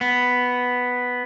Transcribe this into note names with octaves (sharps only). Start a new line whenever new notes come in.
B3